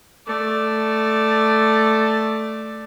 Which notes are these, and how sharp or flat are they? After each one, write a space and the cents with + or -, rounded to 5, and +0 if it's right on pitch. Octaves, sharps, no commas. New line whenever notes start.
A3 +0 D5 +5